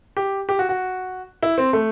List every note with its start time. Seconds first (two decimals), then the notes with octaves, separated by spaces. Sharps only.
0.17 G4
0.49 G4
0.59 F#4
0.69 F#4
1.43 E4
1.58 C4
1.73 A3